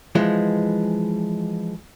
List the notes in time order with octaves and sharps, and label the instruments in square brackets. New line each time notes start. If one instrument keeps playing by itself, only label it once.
[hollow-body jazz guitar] E3 F3 G#3